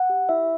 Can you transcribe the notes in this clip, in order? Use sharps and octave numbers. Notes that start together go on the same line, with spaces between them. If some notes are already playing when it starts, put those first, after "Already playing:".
Already playing: F#5
G4
E4 E5